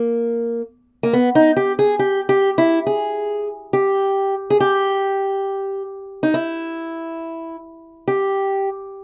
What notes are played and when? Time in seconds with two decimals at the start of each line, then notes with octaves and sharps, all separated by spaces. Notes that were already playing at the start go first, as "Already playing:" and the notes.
Already playing: A#3
1.03 A#3
1.13 B3
1.35 D#4
1.57 G4
1.79 G#4
1.99 G4
2.29 G4
2.58 E4
2.87 G#4
3.73 G4
4.50 G#4
4.60 G4
6.23 D#4
6.34 E4
8.08 G4